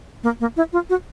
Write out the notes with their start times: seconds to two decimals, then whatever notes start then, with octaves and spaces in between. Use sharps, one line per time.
0.23 A#3
0.40 A#3
0.57 E4
0.73 F4
0.90 F#4